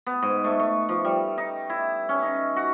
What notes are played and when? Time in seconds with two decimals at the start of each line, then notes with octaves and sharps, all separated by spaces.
0.06 B3
0.23 G#2
0.44 A3
0.59 A3
0.89 F3
1.05 G3
1.38 D#4
1.70 E4
2.09 C#4
2.22 D#4
2.56 F#4